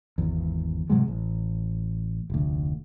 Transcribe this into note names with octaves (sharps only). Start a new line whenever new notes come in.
G#1 E2
G#2 C3 F#3 G#3
A1
F1 D2